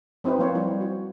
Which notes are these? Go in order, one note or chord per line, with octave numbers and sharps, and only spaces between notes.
F#3 C4 D#4 E4 B4
F3 A#3 C5 C#5
F3 G3 E4
F#4